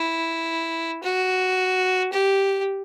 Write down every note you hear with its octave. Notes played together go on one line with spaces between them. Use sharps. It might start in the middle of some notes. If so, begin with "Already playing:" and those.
Already playing: E4
F#4
G4